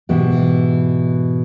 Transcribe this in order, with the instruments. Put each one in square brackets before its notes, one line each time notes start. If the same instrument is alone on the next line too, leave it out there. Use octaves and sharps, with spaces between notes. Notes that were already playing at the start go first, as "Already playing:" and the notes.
[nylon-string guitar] G#2 B2 E3 E4 G4